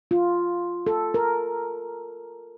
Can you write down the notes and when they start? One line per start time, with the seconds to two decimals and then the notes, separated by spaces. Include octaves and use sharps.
0.11 F4
0.87 A4
1.14 A#4